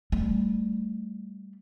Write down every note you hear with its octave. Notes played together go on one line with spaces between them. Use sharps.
G3 A3